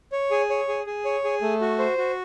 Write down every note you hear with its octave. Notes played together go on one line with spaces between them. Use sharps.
C#5
G#4
C#5
G#4
G#4
C#5
G#4
A3
F#4
C5
F#4